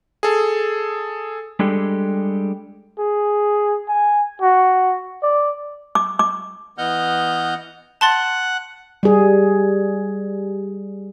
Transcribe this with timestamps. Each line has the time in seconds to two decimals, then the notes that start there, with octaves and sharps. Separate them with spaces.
0.23 G#4 A4
1.59 G3 G#3 D4 G4 A4
2.99 G#4
3.89 G#5
4.41 F#4
5.22 D5
5.95 D6
6.19 D6
6.78 E3 B3 D#5 F#5 F6 G6
8.01 F#5 A5 C6 A6
9.03 G3 G#4